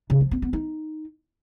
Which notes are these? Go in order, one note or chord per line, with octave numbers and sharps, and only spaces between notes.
C#3
F3
C4
B3
D#4